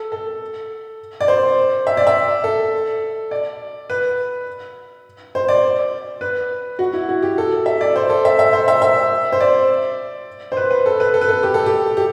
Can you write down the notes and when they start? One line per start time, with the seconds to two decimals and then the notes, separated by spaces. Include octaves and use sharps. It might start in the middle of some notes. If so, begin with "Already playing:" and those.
Already playing: A4
0.12 A4
1.21 D5
1.28 C5
1.87 E5
1.97 D5
2.07 E5
2.44 A4
3.31 D5
3.90 B4
5.35 C5
5.48 D5
6.21 B4
6.79 F#4
6.93 E4
7.09 F#4
7.22 G4
7.38 A4
7.66 E5
7.81 D5
7.96 C5
8.10 A4
8.25 E5
8.39 E5
8.53 C5
8.68 E5
8.82 E5
9.32 C5
9.40 D5
10.52 C5
10.57 B4
10.71 B4
10.86 A4
11.00 B4
11.14 A4
11.21 B4
11.29 A4
11.43 G4
11.54 A4
11.66 G4
11.97 G4